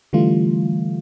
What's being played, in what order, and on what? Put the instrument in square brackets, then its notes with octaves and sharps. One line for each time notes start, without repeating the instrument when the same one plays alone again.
[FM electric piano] D3 E3 G3 A3 F4